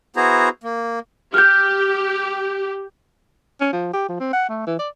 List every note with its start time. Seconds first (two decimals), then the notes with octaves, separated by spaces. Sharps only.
0.16 B3 E4 F#4 G#4 C5 A#5
0.64 A#3
1.34 G4 F6 G6
3.61 C#4
3.73 F3
3.93 G4
4.09 F3
4.20 C4
4.33 F#5
4.49 A3
4.67 E3
4.79 D5